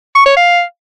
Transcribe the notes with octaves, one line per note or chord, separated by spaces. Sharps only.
C#6
C#5
F5